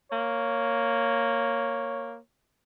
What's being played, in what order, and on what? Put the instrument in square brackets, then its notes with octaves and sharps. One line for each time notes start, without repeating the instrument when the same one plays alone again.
[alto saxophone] A#3 [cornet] C#5